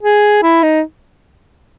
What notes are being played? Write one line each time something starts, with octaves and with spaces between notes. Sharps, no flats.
G#4
E4
D#4